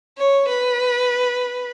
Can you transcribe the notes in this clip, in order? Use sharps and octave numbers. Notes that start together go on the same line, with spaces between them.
C#5
B4